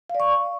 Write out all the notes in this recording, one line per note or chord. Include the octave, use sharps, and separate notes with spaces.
F5
D5
C#6